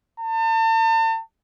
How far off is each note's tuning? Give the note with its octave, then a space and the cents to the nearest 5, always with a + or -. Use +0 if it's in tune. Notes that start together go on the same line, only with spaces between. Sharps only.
A5 +40